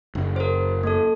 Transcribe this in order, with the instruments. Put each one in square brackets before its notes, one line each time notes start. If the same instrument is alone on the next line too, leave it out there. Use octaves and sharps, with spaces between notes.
[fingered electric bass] F#1
[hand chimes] A#4 C5
A#3 A4